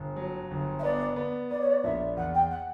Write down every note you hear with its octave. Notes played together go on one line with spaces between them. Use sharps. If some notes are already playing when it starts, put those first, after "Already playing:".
Already playing: G1
F#3
G1
E5
B3 D5
B3
B3 D5
C#5
D5
A#1 E5
E2 F#5
G5
F#5